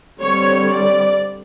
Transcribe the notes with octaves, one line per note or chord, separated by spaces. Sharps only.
D3 G3 C4 C#5
D5